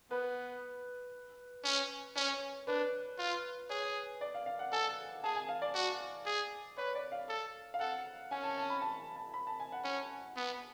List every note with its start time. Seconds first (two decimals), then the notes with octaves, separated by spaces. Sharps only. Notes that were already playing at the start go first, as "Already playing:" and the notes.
0.11 B3 B4
1.64 C#4
2.16 C#4 C#5
2.67 D4 B4
3.19 F4
3.70 G#4 C#5
4.21 D5
4.34 F5
4.46 F5
4.59 F#5
4.72 A4 G#5
5.24 G#4 A5
5.36 G#5
5.49 F5
5.62 D5
5.74 F#4
6.26 G#4
6.78 B4 C#5
6.95 D5
7.12 F5
7.29 A4
7.74 F5
7.80 A4 F#5
8.31 C#4 G#5
8.43 A5
8.57 A5
8.70 B5
8.82 A5
9.16 A5
9.34 B5
9.47 A5
9.60 G#5
9.72 F#5
9.85 C#4
10.36 B3